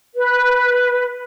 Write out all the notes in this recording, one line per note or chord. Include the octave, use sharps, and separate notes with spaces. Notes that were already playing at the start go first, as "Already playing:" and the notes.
B4